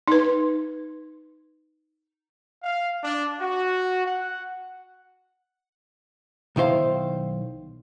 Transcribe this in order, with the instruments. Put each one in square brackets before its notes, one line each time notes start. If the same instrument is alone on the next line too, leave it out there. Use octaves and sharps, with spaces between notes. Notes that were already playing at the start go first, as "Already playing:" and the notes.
[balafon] D#4 B4
[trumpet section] F5
D4
F#4
F#5
[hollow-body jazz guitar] B1 D#3 E4 C5 F5